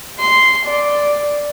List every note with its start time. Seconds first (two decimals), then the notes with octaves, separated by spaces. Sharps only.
0.20 C6
0.66 D5